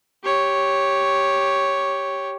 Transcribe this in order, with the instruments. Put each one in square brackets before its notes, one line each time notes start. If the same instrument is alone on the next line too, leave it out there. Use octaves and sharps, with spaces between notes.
[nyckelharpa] G4 C#5